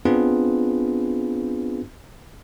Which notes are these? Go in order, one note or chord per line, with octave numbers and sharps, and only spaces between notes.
B3 C4 D4 F4 G#4 B4